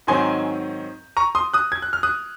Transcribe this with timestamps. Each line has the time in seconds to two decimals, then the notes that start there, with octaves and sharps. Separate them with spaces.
0.07 G#2 D#3 F#3 C4 G#5 C6
1.17 A#5 C#6
1.35 C6 D#6
1.53 D#6 F#6
1.72 G#6
1.82 F#6
1.93 F6
2.03 D#6 F#6